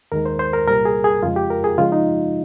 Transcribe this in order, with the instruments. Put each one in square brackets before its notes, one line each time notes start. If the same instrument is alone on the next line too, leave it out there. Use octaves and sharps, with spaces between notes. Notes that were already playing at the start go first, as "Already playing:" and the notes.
[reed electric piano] D#2 D#3 G#3 A#4
C5
C5
A#4
C2 A#2 G3 A#4
G#4
G#4
F2 C#3 G#3 F4
G4
A#4
G#4
C#2 C#3 F3 G#3 F4
D#4